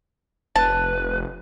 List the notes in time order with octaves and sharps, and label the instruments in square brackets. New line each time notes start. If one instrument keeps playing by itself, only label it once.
[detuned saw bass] F1 [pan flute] B4 [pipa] A5